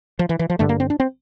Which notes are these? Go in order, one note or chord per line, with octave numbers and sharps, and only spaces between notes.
F3
E3
E3
F3
G2 D3 A3
A#3
C4
D4
C4